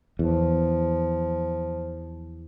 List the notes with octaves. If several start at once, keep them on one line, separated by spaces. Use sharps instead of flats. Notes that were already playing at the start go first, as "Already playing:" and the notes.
E2 F3